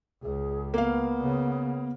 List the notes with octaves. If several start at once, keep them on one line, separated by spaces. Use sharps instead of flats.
C#2 G#4
A#3 B3 F5
C#3